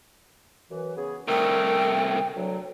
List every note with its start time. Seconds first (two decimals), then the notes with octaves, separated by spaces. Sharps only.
0.69 F#2 E3
0.96 C#3 B3 G#4
1.28 C2 A3 A#4 G5
2.35 D2 F#3